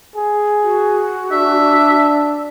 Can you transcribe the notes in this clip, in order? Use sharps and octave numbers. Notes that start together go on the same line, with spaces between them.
G#4
F#4
D4 E5